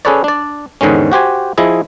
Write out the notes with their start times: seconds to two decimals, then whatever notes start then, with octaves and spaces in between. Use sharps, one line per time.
0.05 C#4 G#4 A4 B4 C#5 D5
0.24 D4 D5
0.81 E2 G#2 D3 D#3 G#3 C#4
1.12 F#4 G4 C5 G#5
1.58 F3 E4 G#4 D#5